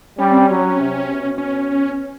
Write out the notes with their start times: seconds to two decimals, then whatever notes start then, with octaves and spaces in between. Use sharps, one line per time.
0.18 G3 C#4
0.31 C4
0.43 C#4
0.49 F#3
0.79 C3
1.09 B2
1.38 C#4